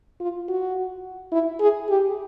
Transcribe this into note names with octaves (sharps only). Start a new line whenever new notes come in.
F4
F#4
E4
G#4
G4